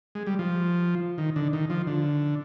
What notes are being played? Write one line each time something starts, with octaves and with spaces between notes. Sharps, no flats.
G#3
G3
F3
D#3
D3
D#3
F3
D3